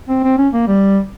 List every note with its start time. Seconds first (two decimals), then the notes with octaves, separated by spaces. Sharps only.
0.09 C4
0.24 C4
0.38 C#4
0.53 A#3
0.67 G3